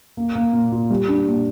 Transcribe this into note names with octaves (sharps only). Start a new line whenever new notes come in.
A#3
A#3
A#2
F4
G3
D4
A#2